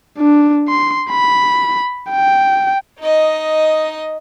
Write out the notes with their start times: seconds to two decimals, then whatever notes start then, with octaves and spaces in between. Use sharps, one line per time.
0.18 D4
0.68 C6
1.11 B5
2.10 G5
2.99 D#4 D#5